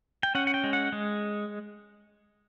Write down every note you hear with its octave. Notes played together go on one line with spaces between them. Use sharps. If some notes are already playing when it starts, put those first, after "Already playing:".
G5
C#4 F#5
F#5
G5
G#3
F#5
G#3